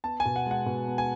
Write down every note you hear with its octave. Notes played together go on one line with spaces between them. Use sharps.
B3 A5
G#5
B2
F#5
G#3 F#5
B2
B3
G#5